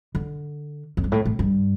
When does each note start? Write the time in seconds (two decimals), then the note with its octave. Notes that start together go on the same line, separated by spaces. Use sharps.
0.15 D3
0.97 F2
1.04 G2
1.12 A2
1.25 A2
1.39 G2